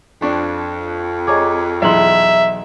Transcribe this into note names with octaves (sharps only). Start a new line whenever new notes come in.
F2 D4 C#6
G#4 C#5 D#5 A#5 D6 G#6
B1 E3 G#4 E5 A#5 C6 F#7